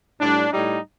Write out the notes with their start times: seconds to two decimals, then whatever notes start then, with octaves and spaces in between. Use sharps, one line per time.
0.21 A2 G3 D4
0.52 A2 G3 D#4